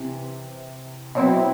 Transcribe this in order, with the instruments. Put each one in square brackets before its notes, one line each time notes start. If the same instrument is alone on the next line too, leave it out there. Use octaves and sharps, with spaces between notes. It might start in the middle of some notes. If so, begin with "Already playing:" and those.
Already playing: [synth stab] C3 E3
B2 F#3 C4 E4